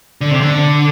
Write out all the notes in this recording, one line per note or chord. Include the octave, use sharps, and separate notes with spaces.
D3
C3
D3